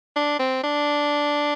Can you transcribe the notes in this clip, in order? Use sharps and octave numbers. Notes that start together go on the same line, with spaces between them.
D4
C4
D4